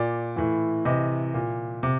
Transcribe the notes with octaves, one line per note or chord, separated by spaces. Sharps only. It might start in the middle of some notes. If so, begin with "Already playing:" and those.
Already playing: A#2 D5
A2 E3
C3 E3 D#5
A#2
C3